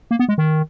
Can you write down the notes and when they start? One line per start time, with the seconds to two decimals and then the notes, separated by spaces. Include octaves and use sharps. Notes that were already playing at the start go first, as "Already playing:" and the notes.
0.11 A#3
0.19 B3
0.29 G#3
0.38 D#3